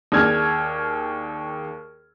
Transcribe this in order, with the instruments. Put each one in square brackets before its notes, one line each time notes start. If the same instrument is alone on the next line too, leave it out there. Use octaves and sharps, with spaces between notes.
[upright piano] D#2 D4 G#4 E6 F6 G#6